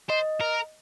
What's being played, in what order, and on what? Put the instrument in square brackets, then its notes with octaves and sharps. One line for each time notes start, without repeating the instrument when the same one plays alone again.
[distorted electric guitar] C5 [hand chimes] D#5
[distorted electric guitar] A#4